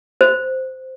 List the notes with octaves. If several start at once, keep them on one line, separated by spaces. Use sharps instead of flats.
C5